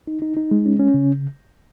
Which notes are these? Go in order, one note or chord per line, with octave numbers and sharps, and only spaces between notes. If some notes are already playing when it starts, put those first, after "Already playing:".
D#4
D#4
D#4
G#3
C#4
C#4
C#3